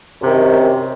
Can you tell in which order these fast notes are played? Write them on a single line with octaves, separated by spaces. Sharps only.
F#2 C3 D#3